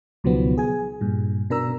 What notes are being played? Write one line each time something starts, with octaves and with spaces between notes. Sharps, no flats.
C#2 B2 D#3 F3 F#3 B3
G#4 G#5
G2 A#2
B2 D4 A#4 A#5 E6